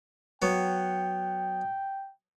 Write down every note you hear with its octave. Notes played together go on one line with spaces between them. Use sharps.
F#3 B3 G5